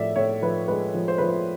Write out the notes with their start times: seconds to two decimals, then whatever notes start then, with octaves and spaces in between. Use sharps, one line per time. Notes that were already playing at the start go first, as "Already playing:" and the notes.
Already playing: A2 F3 D5 E5
0.16 A2 C#5
0.42 F3 B4
0.68 G#3 B4
0.94 F3
1.08 C5
1.18 F3 B4
1.28 C5